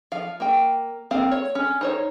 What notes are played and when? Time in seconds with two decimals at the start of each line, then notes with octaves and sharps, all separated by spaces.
0.12 F3 F5
0.40 A#3 G5
1.11 A#3 C4 F5
1.31 C#5
1.55 C#4
1.81 D#4 C5 C#5